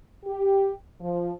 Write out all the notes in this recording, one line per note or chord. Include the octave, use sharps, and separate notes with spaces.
G4
F3